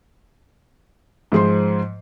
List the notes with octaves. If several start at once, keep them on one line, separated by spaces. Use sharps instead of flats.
G#2 F3 G#4 C5 C6